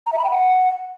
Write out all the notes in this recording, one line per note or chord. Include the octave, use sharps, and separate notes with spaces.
A#5
E5
B5
G5
F#5